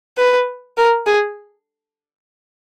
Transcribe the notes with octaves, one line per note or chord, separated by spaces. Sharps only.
B4
A#4
G#4